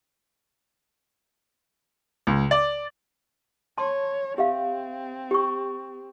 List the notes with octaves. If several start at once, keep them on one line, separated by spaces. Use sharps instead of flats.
C#2
D5
C#5 A5 C6
C4 G4 E5 F5
G4 C#6